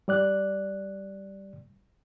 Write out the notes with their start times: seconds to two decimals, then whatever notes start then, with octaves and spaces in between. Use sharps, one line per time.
0.08 G3 D5 F#6